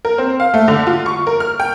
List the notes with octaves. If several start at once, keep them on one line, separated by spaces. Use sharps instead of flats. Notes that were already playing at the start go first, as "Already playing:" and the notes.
A#4
C4
F5
A3
D3
F4
C#6
A#4
F6
G5